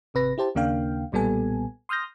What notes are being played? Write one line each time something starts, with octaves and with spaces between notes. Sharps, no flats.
G#1 C3 B4 A#6
E4 G4 C5 A5
D#2 C#3 A#3 D4 F5 G5
B1 A#2 G3 B3 A4 G#5
C6 D#6 F6 G6 A#6